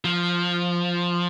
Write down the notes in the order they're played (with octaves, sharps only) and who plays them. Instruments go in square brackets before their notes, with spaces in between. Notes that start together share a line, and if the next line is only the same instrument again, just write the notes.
[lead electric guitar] F3